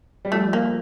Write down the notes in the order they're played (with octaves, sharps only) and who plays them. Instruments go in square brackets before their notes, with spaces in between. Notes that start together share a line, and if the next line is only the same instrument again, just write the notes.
[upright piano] G3
[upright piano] F3 [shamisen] A3
[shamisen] A#3